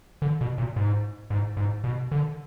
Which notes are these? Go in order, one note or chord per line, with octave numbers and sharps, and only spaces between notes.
D3
B2
A#2
G#2
G#2
G#2
B2
D3